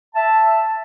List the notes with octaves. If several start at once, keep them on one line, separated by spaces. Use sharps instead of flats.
E5 A5